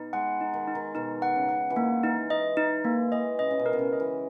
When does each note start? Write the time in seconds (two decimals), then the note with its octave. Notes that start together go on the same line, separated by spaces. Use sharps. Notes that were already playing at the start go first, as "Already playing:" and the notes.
Already playing: B2 B3 D#4
0.13 G#3 F#5
0.41 D#4
0.54 D#3
0.67 D#4
0.75 D#3
0.95 B2 D#4
1.22 F#5
1.36 C#3
1.49 F#5
1.70 E3
1.76 D#3 A#3
2.03 E3 D#4
2.30 E3 D#5
2.57 D#4
2.84 G#3 A#3
3.12 E3 D#5
3.39 C#3 D#5
3.51 C#3
3.59 B2
3.66 A#4
3.73 B2
3.79 C#3
3.93 D#5
4.00 E3